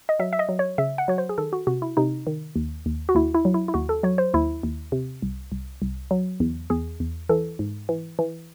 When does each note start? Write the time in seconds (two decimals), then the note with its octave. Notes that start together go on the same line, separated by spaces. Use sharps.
0.09 D#5
0.19 F#3 E5
0.33 E5
0.39 D#5
0.49 F#3
0.59 C#5
0.78 C#3 E5
0.98 F#5
1.08 F#3 C#5
1.18 C5
1.29 G#4
1.38 D#3 A4
1.53 F#4
1.67 C3 F#4
1.82 E4
1.97 C3 D#4
2.27 D#3
2.56 D#2
2.86 D#2
3.09 F#4
3.15 D#2 E4
3.35 E4
3.45 F#3
3.54 E4
3.68 E4
3.74 D#2 F#4
3.89 A4
4.03 F#3 C#5
4.18 C5
4.34 D#2 E4
4.63 D#2
4.92 C3
5.22 C2
5.52 C2
5.82 C2
6.11 F#3
6.40 E2
6.70 E2 G#4
7.00 E2
7.29 E3 A4
7.59 G#2
7.89 E3
8.19 E3